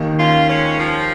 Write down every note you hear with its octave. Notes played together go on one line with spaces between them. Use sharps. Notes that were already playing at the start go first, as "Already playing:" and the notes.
Already playing: D#2 D#3 A#3 D#4
C#4 F4
G#3 C#4
F3